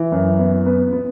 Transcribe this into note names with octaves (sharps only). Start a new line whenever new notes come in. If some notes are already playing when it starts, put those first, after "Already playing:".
Already playing: E3
F#2
B3
B3 B4
B3